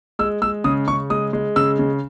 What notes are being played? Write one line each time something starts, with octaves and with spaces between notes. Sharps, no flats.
G#3 E6
G#3 E6
C#3 D#6
C#3 C#6
G#3 D#6
G#3
C#3 E6
C#3